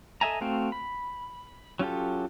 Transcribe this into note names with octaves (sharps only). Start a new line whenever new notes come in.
A4 D#5 E5 G#5 A#5
A3 C4 F#4 F5 G5
B5
F#3 C#4 F4 G4 A4